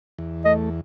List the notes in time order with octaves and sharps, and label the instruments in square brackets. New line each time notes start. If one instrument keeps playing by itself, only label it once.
[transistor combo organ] E2
[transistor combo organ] A3 [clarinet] D#5